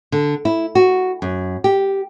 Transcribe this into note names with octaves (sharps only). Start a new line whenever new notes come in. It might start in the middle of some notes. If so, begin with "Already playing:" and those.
D3
E4
F#4
F#2
G4